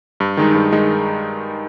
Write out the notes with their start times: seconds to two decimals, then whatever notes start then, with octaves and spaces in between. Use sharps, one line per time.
0.20 G2
0.37 D#3 G#3 D#4
0.54 G2
0.72 D#3 G#3 D#4